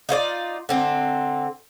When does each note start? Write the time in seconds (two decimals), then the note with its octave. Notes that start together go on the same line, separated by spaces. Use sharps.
0.09 D#4 F4 C5 D5
0.69 D3 C4